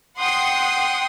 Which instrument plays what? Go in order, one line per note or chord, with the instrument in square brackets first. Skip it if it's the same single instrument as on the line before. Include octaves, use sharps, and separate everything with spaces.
[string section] F#5 G5 C6 D#6